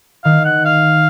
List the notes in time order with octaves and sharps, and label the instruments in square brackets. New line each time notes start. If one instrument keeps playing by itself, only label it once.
[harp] D#3 [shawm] F5
[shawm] F#5
F5